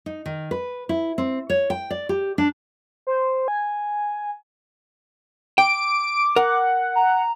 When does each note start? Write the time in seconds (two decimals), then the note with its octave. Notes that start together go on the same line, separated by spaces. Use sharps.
0.06 D#4
0.26 D#3
0.51 B4
0.89 E4
1.18 C4
1.50 C#5
1.70 G5
1.90 D5
2.09 G4
2.38 D4
3.07 C5
3.48 G#5
5.58 G5 D6 D7
6.36 A#4 F#5
6.95 A#5